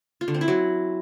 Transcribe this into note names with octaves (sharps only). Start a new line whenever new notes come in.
F4
D3
C4
E4
F#3